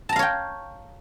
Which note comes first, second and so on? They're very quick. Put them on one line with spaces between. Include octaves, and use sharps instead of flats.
A5 A#5 F5 C#5 G5